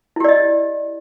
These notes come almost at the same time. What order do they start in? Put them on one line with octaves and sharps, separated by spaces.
E4 G4 D5 D#5